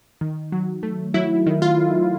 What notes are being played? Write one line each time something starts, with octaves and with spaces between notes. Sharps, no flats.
D#3
F#3
A3
F#3 E4
D#3
F4